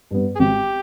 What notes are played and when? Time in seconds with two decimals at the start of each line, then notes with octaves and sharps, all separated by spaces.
0.11 G2 G3 B3
0.35 G#4
0.39 G#1 G4